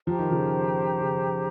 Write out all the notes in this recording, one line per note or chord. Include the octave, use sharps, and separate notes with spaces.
F3 G4 C5 G5 A#5
D#3
C#3 F3
C#3